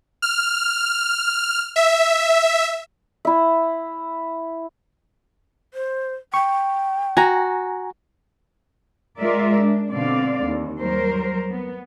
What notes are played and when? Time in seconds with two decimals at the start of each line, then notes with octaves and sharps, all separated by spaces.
0.22 F6
1.76 E5
3.25 E4 E5
5.74 C5
6.34 G5 C#6
7.17 F#4 G#5 A#5
9.20 G#3 F4 A#4 D5 E5
9.62 D4
9.92 B2 D3 C4 D5 F5
10.43 D#2
10.81 F#3 G3 A#4 C5
11.50 B3